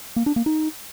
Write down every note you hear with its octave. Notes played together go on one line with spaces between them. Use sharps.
A#3
D4
A#3
D#4